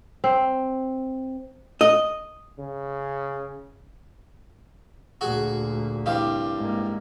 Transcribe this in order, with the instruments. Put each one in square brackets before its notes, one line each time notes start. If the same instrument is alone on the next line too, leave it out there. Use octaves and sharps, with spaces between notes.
[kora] C4
[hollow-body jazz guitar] D#5
[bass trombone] C#3
[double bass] D2 A#2 [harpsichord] F#4 G#4
[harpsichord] C2 G2 F5
[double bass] G#2 A#3